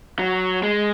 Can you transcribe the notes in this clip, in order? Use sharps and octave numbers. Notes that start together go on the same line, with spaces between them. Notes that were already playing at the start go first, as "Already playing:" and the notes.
F#3
G#3